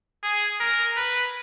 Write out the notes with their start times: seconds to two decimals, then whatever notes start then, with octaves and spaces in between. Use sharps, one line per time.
0.23 G#4
0.60 A#4
0.97 B4